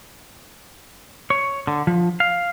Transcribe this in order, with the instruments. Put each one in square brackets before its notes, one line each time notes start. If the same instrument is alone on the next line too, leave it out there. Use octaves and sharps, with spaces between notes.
[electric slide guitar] C#5
D3
F3
F5